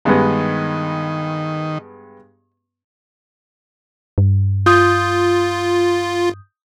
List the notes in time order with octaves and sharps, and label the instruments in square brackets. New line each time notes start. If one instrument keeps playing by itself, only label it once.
[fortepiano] G2 G#3 B3 [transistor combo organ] D#3
[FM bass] G2
[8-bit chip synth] F4 [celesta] D#6 G6